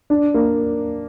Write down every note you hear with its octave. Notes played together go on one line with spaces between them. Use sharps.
D4
A#3